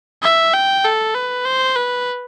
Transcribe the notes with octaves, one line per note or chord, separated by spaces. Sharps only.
E5
G5
A4
B4
C5
B4